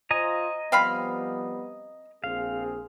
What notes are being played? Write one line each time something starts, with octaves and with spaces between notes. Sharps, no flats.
F4 C5 D#5 G#5 A#5
F3 G3 B3 C4 F5 B5
A#1 C4 G#4 F5